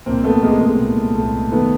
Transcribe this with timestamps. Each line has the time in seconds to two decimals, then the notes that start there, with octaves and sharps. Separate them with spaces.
0.06 C2 A#2 A#3 C4
0.24 A3 B3
0.42 C2 A#2 G#3 A#3
0.61 G#3
0.79 C2 A#2
1.15 C2 A#2 A3
1.52 D#3 A3 B3